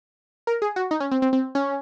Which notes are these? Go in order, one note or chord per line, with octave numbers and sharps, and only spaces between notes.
A#4
G#4
F#4
D#4
C#4
C4
C4
C4
C#4